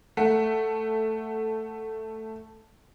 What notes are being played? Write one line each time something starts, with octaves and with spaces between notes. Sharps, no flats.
A3 F#5